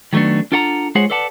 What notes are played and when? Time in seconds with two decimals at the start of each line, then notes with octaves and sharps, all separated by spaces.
0.13 D#3 F#3 A3 B3 D4
0.52 D4 F4 A4 F#5 G5 A#5
0.95 G#3 F4 G#4 C5 C#5 F#5
1.10 A4 B4 D5 F#5 A5